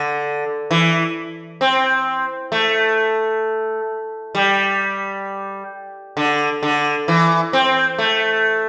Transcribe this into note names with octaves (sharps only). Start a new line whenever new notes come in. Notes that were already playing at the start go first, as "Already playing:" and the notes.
Already playing: D3
E3
C4
A3
G3
D3
D3
E3
C4
A3